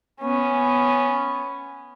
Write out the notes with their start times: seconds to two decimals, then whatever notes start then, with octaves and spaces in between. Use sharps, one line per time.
0.21 B3 C#4